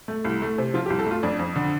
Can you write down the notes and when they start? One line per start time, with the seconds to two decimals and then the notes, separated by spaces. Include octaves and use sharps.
0.08 A3
0.25 C2
0.42 A3
0.58 C3
0.74 F3 F4
0.86 G4
0.90 C2
0.99 A4
1.06 A3 F4
1.23 F2 D4
1.39 F2
1.56 D3